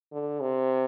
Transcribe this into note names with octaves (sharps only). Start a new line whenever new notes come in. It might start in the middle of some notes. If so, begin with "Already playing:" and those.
D3
C3